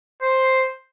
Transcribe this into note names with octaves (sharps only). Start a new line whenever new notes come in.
C5